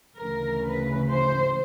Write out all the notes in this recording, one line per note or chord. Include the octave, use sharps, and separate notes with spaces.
D2 C#3 E3 A#4
B4
C5